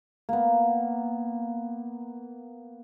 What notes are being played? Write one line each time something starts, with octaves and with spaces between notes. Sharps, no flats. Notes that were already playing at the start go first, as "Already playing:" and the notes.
A#3 B3